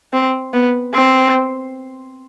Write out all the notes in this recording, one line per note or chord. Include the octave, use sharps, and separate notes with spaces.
C4
B3
C4